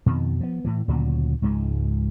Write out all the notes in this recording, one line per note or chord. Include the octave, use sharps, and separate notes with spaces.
F2 B2 D#3
F3 B3
A2 E3
D2 A#2 C#3 F#3
C#2 G#2 F3 G#3